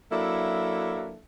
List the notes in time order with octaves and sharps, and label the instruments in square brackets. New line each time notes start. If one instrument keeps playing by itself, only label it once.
[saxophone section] F#3 A#3 D4 E4 A4 E5